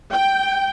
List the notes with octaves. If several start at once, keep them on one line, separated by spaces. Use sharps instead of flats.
G5